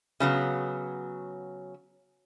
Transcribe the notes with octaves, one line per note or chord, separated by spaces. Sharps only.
C#3 F#3 B3